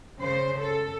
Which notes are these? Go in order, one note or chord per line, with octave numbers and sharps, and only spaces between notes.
C#3 C5
A4